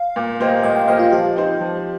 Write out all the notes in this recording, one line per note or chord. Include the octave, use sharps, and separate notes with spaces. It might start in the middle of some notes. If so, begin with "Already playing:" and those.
Already playing: F5
A#2
A#3 G4 C5 D#5
A#2 D#5
G5
A#3 G4 C5 D#5 F5
F4
F3 G4
C4 D#4 C5
F3